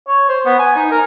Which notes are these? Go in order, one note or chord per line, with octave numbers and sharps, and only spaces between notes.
C#5
C5
B3
G#5
D#4
A#4